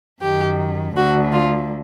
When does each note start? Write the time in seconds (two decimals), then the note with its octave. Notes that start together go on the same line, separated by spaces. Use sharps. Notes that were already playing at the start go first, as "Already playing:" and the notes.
0.21 F#2 D#3 G4
0.95 D2 D3 F#4
1.32 F4